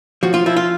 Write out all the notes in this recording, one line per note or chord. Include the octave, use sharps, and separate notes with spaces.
F3 F#4
F4
F3 E4
F4